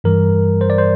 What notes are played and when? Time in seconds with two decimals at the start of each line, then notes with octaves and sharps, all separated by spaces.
0.04 G2 E3 G3 A#4
0.61 C5
0.70 D5
0.78 C5